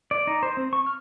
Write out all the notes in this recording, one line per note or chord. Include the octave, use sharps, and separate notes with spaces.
D5
D#4
C5
C4
C#6
F6